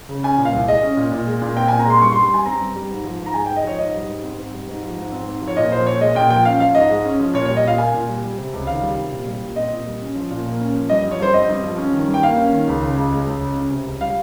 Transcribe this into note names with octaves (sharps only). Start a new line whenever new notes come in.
C#3
C#4 G#5
A#2
F5
C2
G#3 D#5
C#4
A#2
A#2
G#3
A#2
C4 G5
A#2 G#5
A#5
G#3 C6
G2 C#6
C6
G3
C6
G2 G#5
C4 A#5
G2
G3
G#2
F3
G#2
A#5
G#3 G#5
G5
G#2
D#5
F3 C#5
G#2 D#5
G3
G#2
C4
G#2
G3
G#2
F3
G#2
C4
G#2
F3
C#5
A#2 D#5
F3 C5
A#2 C#5
G#3 D#5
A#2 G5
F3 G5
C#4 F5
F3 F5
G#2 D#5
G#3
C#4
F3
A#2 C#5
C#5
G3
D#5
A#2 F5
A#3 G#5
A#2
G3
G3
C3
C#2
D#3 F5
G3
C3
A#2
G3
A#2
C4 D#5
A#2
G3
C#4
F3
A#2
A#3
C#4
F3
G2 D#5
F3
C#5
G2 C5
C4 D#5
G2
F3
C#4
D#3
G2
G5
A#3 F5
C#4
D#3
C#2
C#3
C#2
G#3
C#2
C#3
C#4
C3
C#2
G3 F5